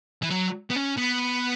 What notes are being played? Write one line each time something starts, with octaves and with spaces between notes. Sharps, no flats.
E3
F#3
B3
C#4
B3